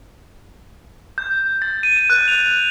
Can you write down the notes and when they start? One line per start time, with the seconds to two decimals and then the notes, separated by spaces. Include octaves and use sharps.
1.18 G6
1.62 A6
1.83 D#7
1.97 E7
2.10 F#6
2.28 F7